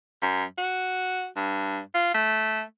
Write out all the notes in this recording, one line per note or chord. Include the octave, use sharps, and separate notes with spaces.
F#2
F#4
G2
F4
A3